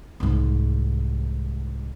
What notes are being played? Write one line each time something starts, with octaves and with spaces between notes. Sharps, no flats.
C2 G#2